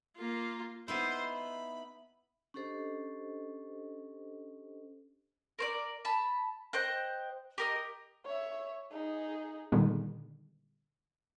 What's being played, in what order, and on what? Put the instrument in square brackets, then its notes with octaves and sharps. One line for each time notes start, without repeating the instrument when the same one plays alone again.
[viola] A#3 F4
[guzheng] B3 D#4 E4 [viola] C5
[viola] B5
[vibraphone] C#4 D4 G4 A4 C5 D#5
[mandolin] A#4 C5 D5
A5 B5
C5 D#5 G5 F#6
G4 A#4 D#5
[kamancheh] C#5 E5
D#4 G#4
[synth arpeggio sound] A#2 D3 D#3 G3 G#3 B3